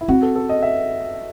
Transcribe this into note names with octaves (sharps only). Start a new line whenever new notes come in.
E4
C4 F#4
A4
A4
D#5
E5